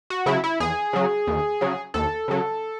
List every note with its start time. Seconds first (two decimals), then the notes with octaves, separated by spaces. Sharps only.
0.10 F#4
0.26 C#3 F#3 E4
0.44 E4
0.60 E2 G#4
0.93 C#3 F#3
1.27 D#2
1.61 C#3 F#3
1.94 D#2 A4
2.28 C#3 F#3